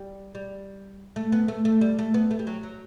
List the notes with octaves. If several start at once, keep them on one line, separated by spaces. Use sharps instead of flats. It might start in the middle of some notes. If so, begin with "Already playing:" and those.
Already playing: G3
G3
A3
B3
A3
A3
G3
A3
B3
A3
G3
F#3
F#3